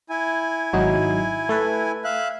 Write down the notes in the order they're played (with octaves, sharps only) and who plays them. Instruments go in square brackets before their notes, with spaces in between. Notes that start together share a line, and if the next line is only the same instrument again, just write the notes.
[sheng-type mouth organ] E4 G#5
[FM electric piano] G#1 F#3 D#4
A3 A4 B4
[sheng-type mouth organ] E5 F5 F#6